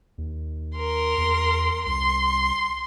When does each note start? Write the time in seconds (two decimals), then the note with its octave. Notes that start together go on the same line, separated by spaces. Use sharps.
0.18 D#2
0.77 A#4 C6
1.18 E2
1.86 C2 C6